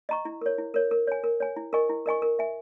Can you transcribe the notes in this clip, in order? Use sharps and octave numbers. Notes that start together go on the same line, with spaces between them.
D#5 A#5 C#6
E4
A#4 C#5
E4
A#4 C#5
A#4
C#5 G#5
A#4
C#5 G#5
E4
A#4 D#5 G#5 C#6
E4
A#4 D#5 G#5 C#6
A#4
E5 G#5